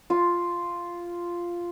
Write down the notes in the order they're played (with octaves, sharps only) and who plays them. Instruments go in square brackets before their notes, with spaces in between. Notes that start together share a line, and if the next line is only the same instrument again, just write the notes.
[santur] F4